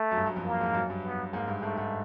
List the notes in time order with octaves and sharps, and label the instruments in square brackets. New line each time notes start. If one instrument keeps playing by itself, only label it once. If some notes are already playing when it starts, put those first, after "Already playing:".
Already playing: [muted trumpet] A3
[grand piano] F#2
G2
F#2
F2
[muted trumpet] A#3
[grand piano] G#2
F#2
G2
[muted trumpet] B3
[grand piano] G#2 [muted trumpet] A#3
[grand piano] G2
[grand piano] G#2 [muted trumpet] A3
[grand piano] G#2